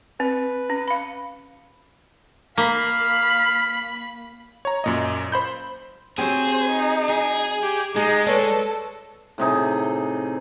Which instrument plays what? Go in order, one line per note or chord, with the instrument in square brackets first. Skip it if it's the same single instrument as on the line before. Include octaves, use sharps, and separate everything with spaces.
[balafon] C4 [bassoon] B4
[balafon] C#4
F5 B5
[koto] A#3 [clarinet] F5 [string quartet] B5
[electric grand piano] C#5 A#5
F#2 A#2 D#5
C5 B5 G6
[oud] F#3 C4 G4 [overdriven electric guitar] G#4 [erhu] C5
[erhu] D#4
[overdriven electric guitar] G#4
[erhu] G4
[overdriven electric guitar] G#3 [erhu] D#4 [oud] G#4
[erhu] A4 [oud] B4 C#5 D5
[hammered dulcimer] A2 C3 D#4 G#4